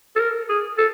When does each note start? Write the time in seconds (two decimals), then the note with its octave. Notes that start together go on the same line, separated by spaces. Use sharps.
0.16 A4
0.20 A#4
0.49 G#4
0.78 A4